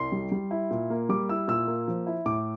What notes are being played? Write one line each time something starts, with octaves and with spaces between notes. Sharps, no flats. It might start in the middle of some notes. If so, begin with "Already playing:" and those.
Already playing: C2 C6
G3
G3
E4
A#2
A#3
G3 D6
E4 E6
A#2 E6
A#3
F3
E4
A2 D6